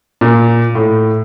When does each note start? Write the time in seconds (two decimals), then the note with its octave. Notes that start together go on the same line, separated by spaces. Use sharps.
0.21 A#2
0.75 A2